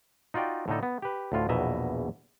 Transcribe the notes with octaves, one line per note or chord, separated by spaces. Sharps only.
D#4 F4 F#4 D5 G5
A2 D3 D#4 A4
B3
G4 B4
D2 A2 F4
A#1 E2 B2 D#5 E5 A#5